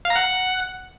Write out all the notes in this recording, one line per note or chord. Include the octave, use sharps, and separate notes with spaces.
F5
A#5
F#5